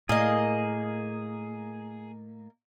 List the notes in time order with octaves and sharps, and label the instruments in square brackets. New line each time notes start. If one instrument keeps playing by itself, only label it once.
[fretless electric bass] A2 [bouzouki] A#3 D#5 [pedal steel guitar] G#4